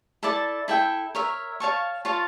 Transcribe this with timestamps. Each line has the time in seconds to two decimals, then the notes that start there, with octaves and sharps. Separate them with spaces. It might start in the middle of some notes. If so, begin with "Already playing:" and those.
0.23 E4 A4 D5 A5
0.68 E4 A4 E5 G5
1.15 A#4 C#5 E5
1.60 C#5 F5 A5 C#6
2.05 F4 C#5 F5 A5